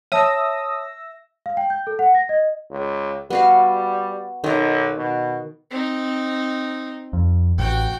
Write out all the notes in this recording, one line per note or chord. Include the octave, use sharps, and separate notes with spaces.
C#5 E5 A5 D#6 E6 A#6
F5
G5
G6
A4
F#5
A#6
D#5
C#2
G3 B3 F#4 F5
B1 D#3 A#5
B2
C4 D#4
F2
A1 F#4 G5